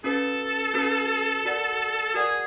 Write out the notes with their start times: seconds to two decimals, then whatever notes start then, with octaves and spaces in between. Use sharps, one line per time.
0.04 C#4 F#4 A4 B4
0.74 C#4 F#4 B4
1.45 F#4 A#4 D5 F#5
2.14 F#4 G#4 A#4 D5 F#5